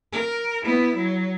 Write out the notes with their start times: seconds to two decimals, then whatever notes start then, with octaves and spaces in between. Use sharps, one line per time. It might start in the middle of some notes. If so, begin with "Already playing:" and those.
0.12 A#4
0.64 B3 E4
0.96 F#3